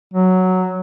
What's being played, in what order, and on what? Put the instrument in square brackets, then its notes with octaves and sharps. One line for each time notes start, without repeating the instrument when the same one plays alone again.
[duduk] F#3